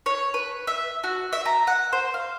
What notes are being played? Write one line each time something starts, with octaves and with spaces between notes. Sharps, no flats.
C#5
B4
E5
F#4
E5
A#5
F#5
C5
F5